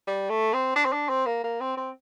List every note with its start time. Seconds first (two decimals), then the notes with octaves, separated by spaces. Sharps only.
0.07 G3
0.30 A3
0.54 C4
0.76 D4
0.85 C4
0.93 D4
1.09 C4
1.26 A#3
1.44 A#3
1.60 C4
1.77 C4